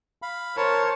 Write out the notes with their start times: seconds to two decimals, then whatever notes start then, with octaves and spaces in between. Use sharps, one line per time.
0.22 F5 B5
0.57 A#4 C5 C#5 A5